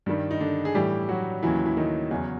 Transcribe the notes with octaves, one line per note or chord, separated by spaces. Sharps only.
G2 D#3 G3
D#4
D3 D4
G#4
A2 E3 G3 G4
F#3 F#4
D#2 C#3 E3 F#3 E4
E4
D#3 D#4
E2 C#3 F#3 C#4